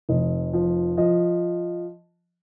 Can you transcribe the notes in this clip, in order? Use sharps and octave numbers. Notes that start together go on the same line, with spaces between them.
F1 D#5
F3
F3 D#5